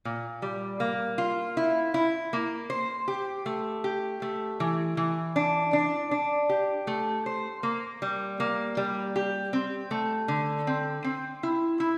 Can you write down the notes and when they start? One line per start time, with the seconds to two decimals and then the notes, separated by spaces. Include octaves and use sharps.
0.05 A#2
0.42 G3
0.80 A#3
1.18 F4
1.57 E4
1.94 E4
2.33 A#3
2.70 C5
3.08 G4
3.46 A3
3.84 G4
4.22 A3
4.60 E3
4.97 E3
5.36 D4
5.73 D4
6.11 D4
6.49 G4
6.87 A3
7.26 C5
7.63 A#3
8.02 G3
8.40 A#3
8.77 G3
9.16 G4
9.53 C4
9.91 A3
10.28 D3
10.67 C4
11.04 C4
11.43 E4
11.80 E4